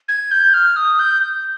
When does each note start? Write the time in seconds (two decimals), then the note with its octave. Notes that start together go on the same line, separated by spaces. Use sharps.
0.09 G#6
0.31 G6
0.54 F6
0.76 D#6
0.99 G6